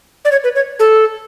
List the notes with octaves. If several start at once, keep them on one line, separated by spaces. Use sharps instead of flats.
D5
C#5
B4
C#5
A4